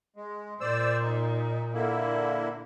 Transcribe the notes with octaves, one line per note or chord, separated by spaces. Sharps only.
G#3
A#2 C5 D5 E6
D#4
D3 A#3 E4